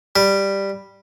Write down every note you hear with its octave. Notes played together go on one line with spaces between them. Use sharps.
G3